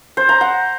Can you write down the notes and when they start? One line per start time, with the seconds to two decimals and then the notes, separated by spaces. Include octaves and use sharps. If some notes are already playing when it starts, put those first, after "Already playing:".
0.17 C5
0.29 A#5
0.41 F#5